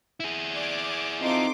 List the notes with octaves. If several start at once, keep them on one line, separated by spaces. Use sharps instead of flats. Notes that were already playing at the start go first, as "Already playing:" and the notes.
E4 G#4
D5 G#5 D6
C4 D#4 F4 A4 C6 D6